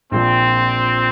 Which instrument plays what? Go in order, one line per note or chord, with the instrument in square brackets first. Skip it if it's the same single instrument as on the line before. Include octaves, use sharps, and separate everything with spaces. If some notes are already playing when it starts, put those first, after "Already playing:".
[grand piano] A#1 A#2 F3 [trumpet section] C4